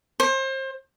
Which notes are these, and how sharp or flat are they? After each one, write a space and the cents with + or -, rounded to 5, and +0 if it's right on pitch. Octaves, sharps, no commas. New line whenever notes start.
C5 +30